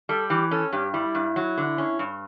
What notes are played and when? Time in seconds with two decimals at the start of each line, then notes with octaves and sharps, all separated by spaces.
0.09 G3 A4
0.30 E3 G4
0.51 C#4 A4
0.72 G2 G4
0.93 G3 E4
1.15 G2
1.36 F#3
1.57 D3
1.78 C#4
1.99 G2